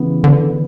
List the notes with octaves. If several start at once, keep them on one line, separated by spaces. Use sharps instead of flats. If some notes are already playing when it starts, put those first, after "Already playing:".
Already playing: C#3 E3 B3
D3 B3